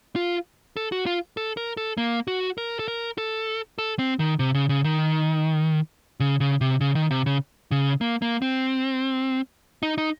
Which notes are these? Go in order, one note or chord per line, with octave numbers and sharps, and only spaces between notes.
F4
A4
F#4
F4
A4
A#4
A4
A#3
F#4
A#4
A4
A#4
A4
A4
C4
D#3
C3
C#3
C#3
D#3
C#3
C#3
C3
C#3
D#3
C3
C#3
C#3
A#3
A#3
C4
D#4
D#4